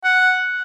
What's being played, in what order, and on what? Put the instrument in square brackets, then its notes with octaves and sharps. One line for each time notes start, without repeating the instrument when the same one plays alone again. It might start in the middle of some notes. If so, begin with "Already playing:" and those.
[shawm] F#5